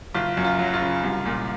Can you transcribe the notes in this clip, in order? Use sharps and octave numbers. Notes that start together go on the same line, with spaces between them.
F#1 F4
F#2
F4
F#3
F4
C#3
C2
A#2